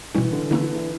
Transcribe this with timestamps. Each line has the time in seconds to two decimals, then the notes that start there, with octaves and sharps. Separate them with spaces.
0.14 B2 E3 G3 C#4
0.32 D3
0.51 D3 E3 A#3 C#4 E4
0.63 E3
0.75 E3